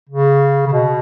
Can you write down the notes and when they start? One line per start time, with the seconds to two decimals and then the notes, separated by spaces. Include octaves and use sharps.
0.09 C#3
0.67 C#3
0.72 B2